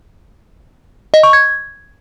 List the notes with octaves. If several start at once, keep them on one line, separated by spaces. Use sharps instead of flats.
D#5
C#6
G#6